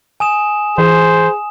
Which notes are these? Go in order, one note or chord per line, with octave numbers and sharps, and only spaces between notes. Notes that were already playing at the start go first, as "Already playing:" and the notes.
G#5 D#6 E7
E3 G#4 C5